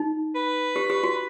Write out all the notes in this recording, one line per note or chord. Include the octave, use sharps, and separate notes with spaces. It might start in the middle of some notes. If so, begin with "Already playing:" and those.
Already playing: D#4
B4
G4
G4
F#4